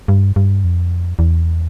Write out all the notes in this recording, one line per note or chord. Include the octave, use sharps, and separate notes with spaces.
G2
G2
F2
E2